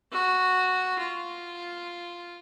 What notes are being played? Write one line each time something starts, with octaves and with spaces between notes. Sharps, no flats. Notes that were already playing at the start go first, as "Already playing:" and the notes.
F#4
F4